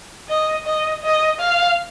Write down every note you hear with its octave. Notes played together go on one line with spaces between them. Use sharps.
D#5
D#5
D#5
F5